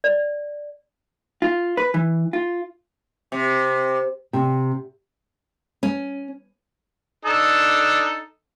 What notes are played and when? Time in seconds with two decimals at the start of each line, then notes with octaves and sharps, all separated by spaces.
0.04 D5
1.42 F4
1.77 B4
1.94 E3
2.33 F4
3.32 C3
4.33 C3
5.83 C#4
7.25 D4 D#4 A4